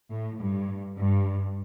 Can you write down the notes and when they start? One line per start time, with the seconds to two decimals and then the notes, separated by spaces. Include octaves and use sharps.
0.11 A2
0.39 G2
0.98 G2